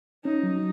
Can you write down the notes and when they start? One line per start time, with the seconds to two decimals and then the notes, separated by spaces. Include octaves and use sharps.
0.25 C#4 D#4
0.43 F#3